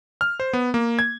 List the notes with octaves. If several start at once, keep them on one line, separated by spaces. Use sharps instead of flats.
F6
C5
B3
A#3
G#6